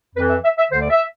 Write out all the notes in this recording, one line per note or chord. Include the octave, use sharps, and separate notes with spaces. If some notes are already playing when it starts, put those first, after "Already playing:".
F2 E3 B4
E5
E5
E5
D2 D3 C5
D5
E5